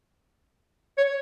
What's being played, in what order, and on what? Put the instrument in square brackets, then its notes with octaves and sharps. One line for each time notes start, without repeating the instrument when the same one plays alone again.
[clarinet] C#5